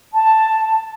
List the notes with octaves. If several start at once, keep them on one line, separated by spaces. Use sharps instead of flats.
A5